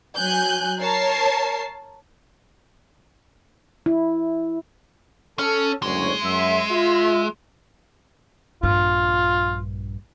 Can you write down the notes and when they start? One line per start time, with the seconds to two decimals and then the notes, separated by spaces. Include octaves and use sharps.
0.17 F#3 G#5 F#6 G6
0.79 A#4 C#5 A5 C7
3.86 E4
5.39 C#4 A4
5.82 F#1 D2 G#3 C#5
6.23 F#2 E5
6.71 F4 E5
8.63 A#1 G2 F4